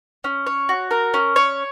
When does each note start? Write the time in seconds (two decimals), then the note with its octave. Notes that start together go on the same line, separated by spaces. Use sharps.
0.24 C#4
0.46 C#5
0.69 F#4
0.91 A#4
1.14 C#4
1.36 C#5